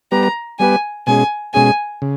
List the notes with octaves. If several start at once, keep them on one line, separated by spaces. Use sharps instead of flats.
G3 B3 G4 B4 A#5
G3 B3 G4 B4 G#5
B2 G#3 C#4 G#4 G#5
B2 G#3 C#4 G#4 G#5
C#3